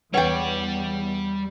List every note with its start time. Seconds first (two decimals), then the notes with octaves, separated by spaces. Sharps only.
0.14 E2 E3 G3 B4 C#5 D5 F#5 G5